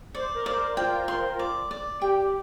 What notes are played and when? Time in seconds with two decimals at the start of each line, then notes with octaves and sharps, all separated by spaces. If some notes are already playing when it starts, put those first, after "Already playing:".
0.15 C5 D5
0.35 A#4
0.46 C5 D5
0.77 F4 G5
1.08 C6
1.39 D5
1.71 D5
2.02 G4 G5